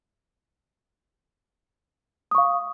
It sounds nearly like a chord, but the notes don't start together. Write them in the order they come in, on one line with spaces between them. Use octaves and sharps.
D#6 C#6 F5